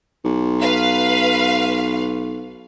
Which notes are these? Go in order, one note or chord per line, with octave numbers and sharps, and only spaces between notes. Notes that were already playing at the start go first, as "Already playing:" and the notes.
B1
B4 F5